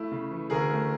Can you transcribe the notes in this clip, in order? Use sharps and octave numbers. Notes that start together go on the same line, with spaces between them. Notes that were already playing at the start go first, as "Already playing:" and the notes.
Already playing: A3 E4
C#3
E3
D2 G#4 A#4
A3